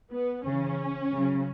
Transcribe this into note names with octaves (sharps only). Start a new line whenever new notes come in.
B3
C#3 E3 C#4
C#3 F#3